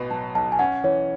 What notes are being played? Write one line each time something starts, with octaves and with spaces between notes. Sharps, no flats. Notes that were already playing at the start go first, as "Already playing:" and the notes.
Already playing: A1 B2 B3
F#3 A5
B1 A5
G#5
C#4 F#5
E3 C#5